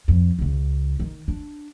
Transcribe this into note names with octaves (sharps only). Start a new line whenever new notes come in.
F2
C#2 C#3
D#3
D4